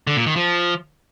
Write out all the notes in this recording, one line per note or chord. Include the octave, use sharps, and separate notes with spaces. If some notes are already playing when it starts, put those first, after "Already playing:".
D3
A#2
D#3
F3